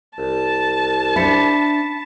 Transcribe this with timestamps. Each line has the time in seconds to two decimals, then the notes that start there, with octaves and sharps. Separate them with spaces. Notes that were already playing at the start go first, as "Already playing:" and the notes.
0.18 C2 A5
1.16 D4 C5 E5 B5 B6 C#7